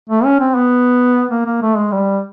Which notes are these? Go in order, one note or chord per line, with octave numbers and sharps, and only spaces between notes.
A3
C#4
C4
B3
A#3
A#3
A3
G#3
G3